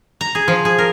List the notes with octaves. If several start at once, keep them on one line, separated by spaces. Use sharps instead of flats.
A#5
G#4
F3
G#4
A#4